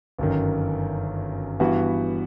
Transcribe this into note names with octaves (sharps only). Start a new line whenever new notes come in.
G1 F#2 D#3
G2 E3 B3 F#4